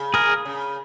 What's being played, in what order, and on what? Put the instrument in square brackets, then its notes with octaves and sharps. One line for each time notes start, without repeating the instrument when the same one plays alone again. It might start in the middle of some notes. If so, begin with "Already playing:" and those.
Already playing: [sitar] C#3
[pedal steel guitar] G#4 A#4
[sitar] C#3